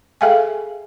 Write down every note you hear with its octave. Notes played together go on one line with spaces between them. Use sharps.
G#4 A4 E5 F5 G5 G#5